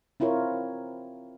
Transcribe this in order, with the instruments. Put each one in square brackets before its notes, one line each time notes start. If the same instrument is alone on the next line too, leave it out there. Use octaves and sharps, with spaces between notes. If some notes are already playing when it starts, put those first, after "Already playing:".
[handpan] C4 E4 F4 A#4 C#5